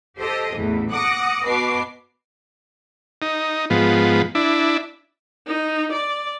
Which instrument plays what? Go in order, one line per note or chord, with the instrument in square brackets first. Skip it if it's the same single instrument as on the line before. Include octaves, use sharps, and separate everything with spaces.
[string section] G4 A4 C5 D#5
A1 E2 E3
F#5 D6 D#6 A#6 C#7
B2 B4 D6 C7
[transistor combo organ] D#4
G#2 F3 B3
D4 E4
[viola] D#4
D5